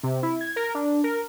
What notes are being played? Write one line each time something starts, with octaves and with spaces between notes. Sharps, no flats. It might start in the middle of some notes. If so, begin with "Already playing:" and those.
C3
E4
G#6
A#4
D4
A#4